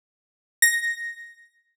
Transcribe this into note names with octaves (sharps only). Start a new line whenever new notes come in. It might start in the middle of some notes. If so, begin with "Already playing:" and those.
A#6